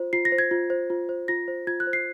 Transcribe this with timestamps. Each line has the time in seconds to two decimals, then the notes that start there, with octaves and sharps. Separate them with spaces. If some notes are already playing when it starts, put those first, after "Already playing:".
Already playing: F4 C5
0.13 F4 C7
0.25 A#6
0.32 C5
0.38 G#6
0.51 F4
0.70 C5
0.90 F4
1.09 C5
1.28 F4 A#6
1.48 C5
1.67 F4 G#6
1.80 F#6
1.87 C5
1.93 C7